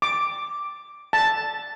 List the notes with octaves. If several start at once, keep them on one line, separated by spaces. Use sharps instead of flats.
D6
A5